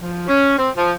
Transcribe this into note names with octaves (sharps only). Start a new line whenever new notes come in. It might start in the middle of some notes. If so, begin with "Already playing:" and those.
F3
C#4
C4
F3